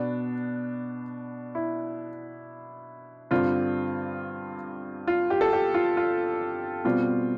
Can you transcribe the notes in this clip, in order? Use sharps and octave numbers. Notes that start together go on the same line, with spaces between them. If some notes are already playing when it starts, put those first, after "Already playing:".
Already playing: B2 B3 D4
E4
G2 D3 G3 C4 F4
F4
G4
A4
G4
F4
F4
B2 G3 C4 F4